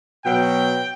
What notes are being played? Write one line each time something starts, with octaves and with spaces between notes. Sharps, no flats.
B2 F#3 G5